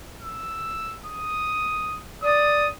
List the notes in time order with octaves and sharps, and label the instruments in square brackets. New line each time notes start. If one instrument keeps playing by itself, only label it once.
[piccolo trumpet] E6
D#6
[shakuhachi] D5 [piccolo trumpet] D#6